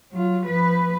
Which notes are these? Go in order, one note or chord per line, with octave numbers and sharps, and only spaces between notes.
F#3 F4
F3 B4